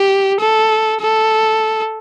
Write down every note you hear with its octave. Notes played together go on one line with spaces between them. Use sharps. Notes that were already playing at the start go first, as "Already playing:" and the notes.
Already playing: G4
A4
A4